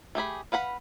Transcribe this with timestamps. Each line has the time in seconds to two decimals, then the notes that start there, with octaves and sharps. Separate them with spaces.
0.15 A3 G4 G#4 B5
0.52 B4 F5 F#5 B5